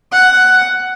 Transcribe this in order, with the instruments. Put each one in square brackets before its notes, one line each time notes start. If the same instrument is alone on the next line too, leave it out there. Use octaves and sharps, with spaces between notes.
[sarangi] F#5